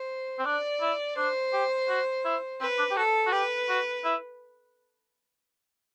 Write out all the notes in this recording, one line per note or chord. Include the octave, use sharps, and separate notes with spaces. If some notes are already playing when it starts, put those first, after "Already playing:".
Already playing: C5
C4
D4 D5
E4
D4 C5
G4
F#4
E4
C4 B4
D4
G4
F#4 A4
F#4
G4 B4
F#4
E4